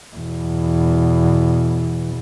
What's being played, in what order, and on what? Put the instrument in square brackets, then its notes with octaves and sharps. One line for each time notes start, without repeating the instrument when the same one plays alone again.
[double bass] E2 B2